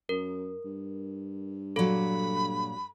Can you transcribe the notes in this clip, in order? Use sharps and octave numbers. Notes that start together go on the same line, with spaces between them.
F#2 A#4
G2
A#2 F#3 A4 B5